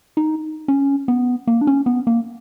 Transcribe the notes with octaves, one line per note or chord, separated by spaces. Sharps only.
D#4
C#4
B3
A#3
D4
C#4
B3
A#3